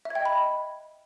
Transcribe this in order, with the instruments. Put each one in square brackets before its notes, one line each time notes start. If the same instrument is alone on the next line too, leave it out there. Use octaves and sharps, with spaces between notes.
[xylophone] E5
G#6
G5
D#5
B5